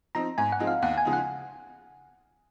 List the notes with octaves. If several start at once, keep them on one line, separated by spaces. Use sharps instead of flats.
F3 C4 D#4 A#5
G#2 G#5
F#5
F3 G#3 C4 D#4
F5
D#2 F#5
G#5
C#3 F3 G#3 D#4
F#5